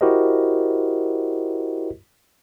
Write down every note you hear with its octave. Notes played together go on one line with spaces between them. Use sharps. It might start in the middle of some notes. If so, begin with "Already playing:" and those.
E4 F#4 G4 A#4 C5 D#5